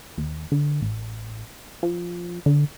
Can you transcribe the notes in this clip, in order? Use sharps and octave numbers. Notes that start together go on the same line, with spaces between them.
D#2
D3
A1
F3
D3